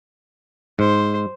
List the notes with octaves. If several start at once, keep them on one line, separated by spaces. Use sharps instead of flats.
G#2 C5